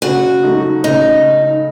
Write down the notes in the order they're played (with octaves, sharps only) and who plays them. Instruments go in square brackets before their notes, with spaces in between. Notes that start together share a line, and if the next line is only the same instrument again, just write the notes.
[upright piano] C#3 [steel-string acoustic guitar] F#4
[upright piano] F#3 A3 D#4
[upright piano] C#3 [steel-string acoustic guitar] D#4